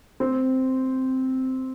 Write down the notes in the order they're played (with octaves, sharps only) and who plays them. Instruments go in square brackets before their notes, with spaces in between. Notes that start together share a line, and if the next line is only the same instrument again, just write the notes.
[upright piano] C4